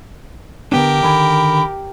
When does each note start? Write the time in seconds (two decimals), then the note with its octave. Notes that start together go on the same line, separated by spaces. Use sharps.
0.72 D3 B3 D4 G4 A#4
1.03 D3 D#3 G#5 B5